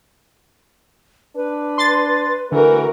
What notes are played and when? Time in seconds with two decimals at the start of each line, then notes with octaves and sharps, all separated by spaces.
1.36 D4 B4
1.78 C6 A6
2.52 D3 E3 A3 F#4 A#4